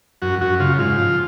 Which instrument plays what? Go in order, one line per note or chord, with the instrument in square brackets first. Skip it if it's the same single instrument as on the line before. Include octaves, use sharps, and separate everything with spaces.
[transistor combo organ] F#2 F#4
F#2 F#4
C#3 F4
G#2 F4
F3